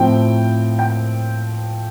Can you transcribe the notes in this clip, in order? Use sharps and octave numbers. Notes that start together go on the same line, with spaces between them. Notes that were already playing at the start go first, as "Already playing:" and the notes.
Already playing: A2 F3 C4 G5
G5